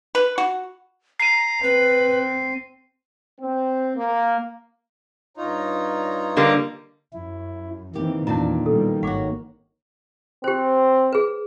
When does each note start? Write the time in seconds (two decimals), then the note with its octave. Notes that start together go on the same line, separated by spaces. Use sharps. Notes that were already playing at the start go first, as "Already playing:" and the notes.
0.15 B4
0.38 F#4
1.20 A#5 C7 D#7
1.63 C4 B4
3.41 C4
3.97 A#3
5.37 G2 D#4 F4 C#5 A#5
6.37 D3 G3 A#3
7.13 F#2 E4
7.95 D#3 E3 A#3 C4 G4
8.27 E2 A#2 C#4 D4 E4 A#5
8.66 B2 G3 A4
9.03 G#1 F#4 C#5 F#5 D6
10.44 C4 G4 C5
11.13 G#4 B4